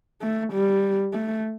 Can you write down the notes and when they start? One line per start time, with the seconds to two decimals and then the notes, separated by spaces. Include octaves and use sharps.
0.22 A3
0.53 G3
1.13 A3